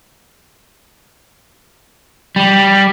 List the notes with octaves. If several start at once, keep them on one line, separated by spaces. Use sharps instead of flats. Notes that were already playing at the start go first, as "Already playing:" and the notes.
G3